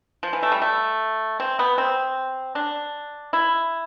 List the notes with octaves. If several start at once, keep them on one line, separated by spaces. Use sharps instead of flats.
F3
E3
A3
G3
A3
C4
B3
C4
D4
E4